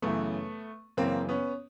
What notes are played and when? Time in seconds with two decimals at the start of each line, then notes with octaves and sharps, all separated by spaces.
0.02 F#2 C#3 E3 A3 B3
0.97 F#2 C#3 E3 A#3 C4
1.29 B3 C#4